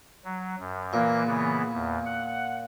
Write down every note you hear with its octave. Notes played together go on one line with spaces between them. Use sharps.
F#3
F#2
A#2 E3 A#3
C#3 E3 B3
E2
F#5